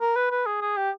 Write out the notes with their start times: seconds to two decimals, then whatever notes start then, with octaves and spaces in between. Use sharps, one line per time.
0.01 A#4
0.16 B4
0.31 B4
0.46 G#4
0.61 G#4
0.77 G4